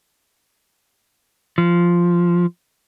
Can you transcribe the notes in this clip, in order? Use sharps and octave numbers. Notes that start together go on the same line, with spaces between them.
F3